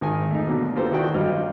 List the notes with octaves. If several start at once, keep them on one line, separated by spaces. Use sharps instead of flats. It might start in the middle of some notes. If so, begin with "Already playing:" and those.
G#1 D#3 G#3 G#5
A3 D#4
B2 D3 F#3 A#3
A#3 F4 G4 A4 B4 C5
D#3 E4 F#4 D5 G5
G2 F#3 D#5 F6